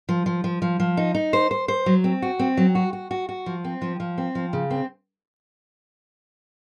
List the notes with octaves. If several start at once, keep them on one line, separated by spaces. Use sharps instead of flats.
F3
F3
F3
F3
F3
D#4
D#4
C5
C5
C5
F#3
C4
F#4
C4
F#3
F#4
F#4
F#4
F#4
F3
C4
F3
F3
C4
F3
C#3
C4